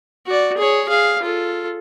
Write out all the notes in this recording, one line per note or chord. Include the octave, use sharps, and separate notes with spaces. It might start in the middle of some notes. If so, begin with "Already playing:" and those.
F#4 D5
G#4 C#5
G#4 F5
F4 A4